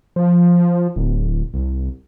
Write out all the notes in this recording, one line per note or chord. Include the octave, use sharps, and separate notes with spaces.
F3
D1
C2